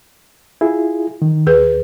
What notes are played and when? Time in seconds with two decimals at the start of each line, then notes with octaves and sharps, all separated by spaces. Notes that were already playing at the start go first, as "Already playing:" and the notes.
0.61 E4 F4 G#4
1.22 D#3
1.47 D#2 G#4 B4